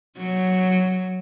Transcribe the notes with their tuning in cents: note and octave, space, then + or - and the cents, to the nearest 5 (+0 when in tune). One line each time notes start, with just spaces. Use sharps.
F#3 +0